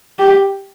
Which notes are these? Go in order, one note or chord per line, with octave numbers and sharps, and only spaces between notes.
G4